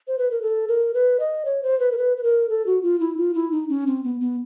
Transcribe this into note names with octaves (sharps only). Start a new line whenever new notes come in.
C5
B4
A#4
A4
A#4
B4
D#5
C#5
C5
B4
A#4
B4
B4
A#4
A4
F#4
F4
E4
F4
E4
D#4
C#4
C4
B3
B3